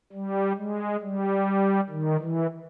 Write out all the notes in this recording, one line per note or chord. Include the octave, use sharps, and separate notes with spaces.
G3
G#3
G3
D#3
E3